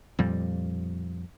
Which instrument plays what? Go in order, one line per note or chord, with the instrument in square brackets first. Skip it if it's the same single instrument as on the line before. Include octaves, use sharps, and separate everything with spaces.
[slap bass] F2 A#2 G3